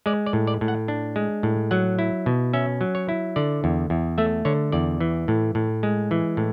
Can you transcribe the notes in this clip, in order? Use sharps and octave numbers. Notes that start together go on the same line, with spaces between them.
G#3 D5
D5
A2
D5
A2
F#5
D4
G#3
A2
F#3 F#5
E4
B2
C#4 E5
F#3
C#5
E4
D3 D5
E2
E2
A3 E5
D3 C#5
E2 D5
E3
A2
A2
G#3
E3
A2